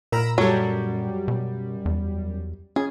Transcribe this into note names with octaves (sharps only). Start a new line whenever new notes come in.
A#2 A#4 A#5 B5 E6
F#2 F#3 G3 A4 C#5
B2
E2
C#4 G#4